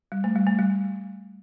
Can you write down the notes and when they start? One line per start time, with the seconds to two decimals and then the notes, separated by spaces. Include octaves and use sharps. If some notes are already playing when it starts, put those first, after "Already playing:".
0.12 G3
0.24 A3
0.35 G3
0.47 A3
0.59 G3